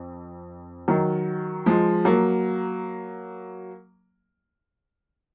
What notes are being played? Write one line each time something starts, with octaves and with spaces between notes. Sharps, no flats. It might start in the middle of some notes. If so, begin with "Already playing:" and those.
Already playing: F2
D#3 F#3
F3 G#3
F#3 A#3